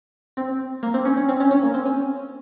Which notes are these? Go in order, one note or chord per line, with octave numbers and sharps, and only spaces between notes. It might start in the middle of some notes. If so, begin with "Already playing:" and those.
C4
A#3
C4
C#4
C#4
C4
C#4
C#4
A#3
C4
C#4